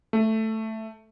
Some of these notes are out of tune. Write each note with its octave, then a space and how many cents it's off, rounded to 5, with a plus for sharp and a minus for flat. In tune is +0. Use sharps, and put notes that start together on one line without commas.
A3 +5